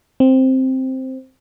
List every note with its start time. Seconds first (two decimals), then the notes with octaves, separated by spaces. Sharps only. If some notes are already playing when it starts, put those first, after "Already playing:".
0.20 C4